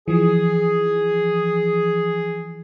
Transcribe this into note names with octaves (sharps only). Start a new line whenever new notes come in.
E3 F3 G#4